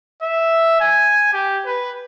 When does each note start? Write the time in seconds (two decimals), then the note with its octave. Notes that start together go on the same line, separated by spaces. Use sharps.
0.22 E5
0.81 G#5
1.33 G4
1.65 B4